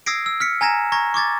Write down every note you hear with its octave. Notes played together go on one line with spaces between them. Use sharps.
D#6 E6 G#6 A#6 C7 D7
E6
F6 B6 C#7
G#5 A#5 G#6 A#6 E7
A#5 C#6 G#6 A#6
C#6 D6 G#6 A6